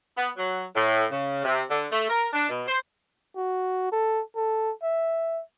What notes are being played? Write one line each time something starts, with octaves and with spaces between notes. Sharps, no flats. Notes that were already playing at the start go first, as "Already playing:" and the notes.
B3
F#3
A2
C#3
C3
D3
A3
A#4
D4
B2
C5
F#4
A4
A4
E5